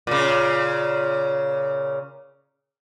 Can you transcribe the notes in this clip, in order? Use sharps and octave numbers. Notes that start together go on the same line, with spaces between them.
A#2 C#3